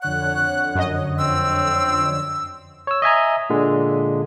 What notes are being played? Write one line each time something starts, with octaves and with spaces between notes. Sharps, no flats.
F2 D3 C#5 F#5 F#6
F#2 D#5
C4 E6
C#5 E6
D#5 E5 G#5 A#5
A#2 D3 G#3